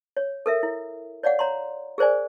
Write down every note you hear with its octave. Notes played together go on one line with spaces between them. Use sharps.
C#5
A4 A#4 E5
E4
C#5 D5 F5 F#5
C#5 A#5 C6
G#4 A#4 C5 D5 G#5